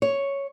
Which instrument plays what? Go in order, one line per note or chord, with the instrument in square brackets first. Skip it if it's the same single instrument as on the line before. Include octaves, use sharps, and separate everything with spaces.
[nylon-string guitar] C#5